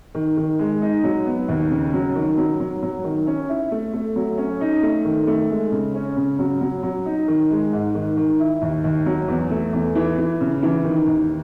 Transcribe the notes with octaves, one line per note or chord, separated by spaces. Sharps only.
D#3
D#3
G#3
D#4
F#3
B3
D#2
C#3
F#3
D#3
F#3
F#3
F#3
D#3
C#4
E4
A3
A3
F#3
C#4
D#4
A3
D#3
A3
G#3
C#3
C#4
C#3
F#3
F#3
F#3
D#4
D#3
G#3
G#2
D#3
D#3
E4
D#2
D#2
F#3
E2
A3
E2
E3
E3
C#3
E3
D#3
D#2